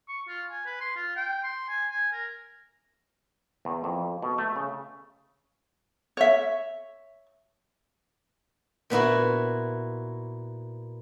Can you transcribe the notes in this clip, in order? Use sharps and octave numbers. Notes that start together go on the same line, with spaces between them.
C#6
F4
G#5
B4
C6
F4
G5
C6
G#5
G#5
A#4
E2
F2
B2
A3
C#3
C#5 E5
A#2 B3 E4 F#4